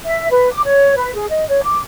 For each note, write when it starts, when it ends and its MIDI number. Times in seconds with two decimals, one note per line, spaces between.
0.06 0.27 76
0.31 0.51 71
0.53 0.61 86
0.65 0.96 73
0.96 1.14 71
1.14 1.26 68
1.29 1.46 75
1.49 1.61 73
1.64 1.78 86